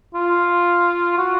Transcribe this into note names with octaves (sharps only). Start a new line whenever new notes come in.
F4
F#4